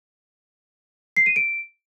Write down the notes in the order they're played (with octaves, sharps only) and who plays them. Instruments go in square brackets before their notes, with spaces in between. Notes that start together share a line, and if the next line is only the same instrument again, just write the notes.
[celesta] C7
D#7
D7